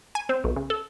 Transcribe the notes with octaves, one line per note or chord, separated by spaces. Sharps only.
G#5
C4
B1
C#3
A4